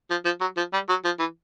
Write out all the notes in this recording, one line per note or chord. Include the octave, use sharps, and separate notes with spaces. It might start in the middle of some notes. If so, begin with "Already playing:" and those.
F3
F3
F#3
F3
G3
F#3
F3
E3